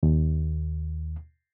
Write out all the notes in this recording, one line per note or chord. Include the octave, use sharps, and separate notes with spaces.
D#2